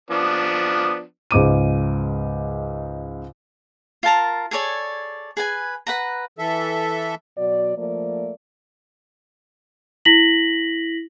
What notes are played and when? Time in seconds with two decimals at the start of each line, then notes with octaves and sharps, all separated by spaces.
0.11 F3 B3 D4
1.31 C#2 G#2 D6 D#7
4.03 F4 A#4 A5 A#5
4.51 G#4 A4 C#5 D5
5.37 G#4 B4 G#5
5.87 B4 F#5 A#5
6.39 E3 A4 E5
7.37 B2 F#3 F#4 D5
7.77 F3 A3 A#3 D5
10.05 E4 A#6 B6 F#7